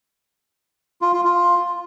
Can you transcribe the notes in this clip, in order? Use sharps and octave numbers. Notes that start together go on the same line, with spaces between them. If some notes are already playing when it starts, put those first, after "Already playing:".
F4
F4
F4